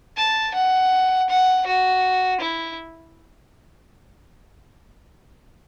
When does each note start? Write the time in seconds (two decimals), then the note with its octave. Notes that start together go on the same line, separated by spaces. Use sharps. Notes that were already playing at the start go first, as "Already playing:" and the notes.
0.17 A5
0.54 F#5
1.30 F#5
1.67 F#4
2.41 E4